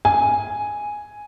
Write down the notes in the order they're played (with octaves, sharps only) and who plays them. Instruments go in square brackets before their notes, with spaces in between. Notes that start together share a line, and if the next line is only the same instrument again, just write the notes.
[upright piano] G#5